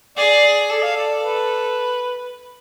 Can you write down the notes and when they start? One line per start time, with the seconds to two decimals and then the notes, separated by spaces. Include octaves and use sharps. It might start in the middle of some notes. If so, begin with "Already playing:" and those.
0.17 G#4 D5
0.70 A4 D5
0.83 F5
0.97 D5
1.22 B4